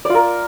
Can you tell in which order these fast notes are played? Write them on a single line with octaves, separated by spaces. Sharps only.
D5 F4 A#4